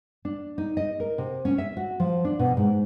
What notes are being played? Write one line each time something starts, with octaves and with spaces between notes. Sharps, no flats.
D4
D#4
D#5
A#4
C3
C#4
E5
F#4
F3
D4
B2
G#2